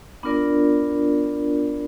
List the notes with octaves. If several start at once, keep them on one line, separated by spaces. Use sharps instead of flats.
B3 D4 F4 A#4 D5